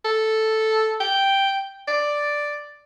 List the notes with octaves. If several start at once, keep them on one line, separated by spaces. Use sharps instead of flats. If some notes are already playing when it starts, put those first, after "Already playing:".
A4
G5
D5